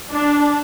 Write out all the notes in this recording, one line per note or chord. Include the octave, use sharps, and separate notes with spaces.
D4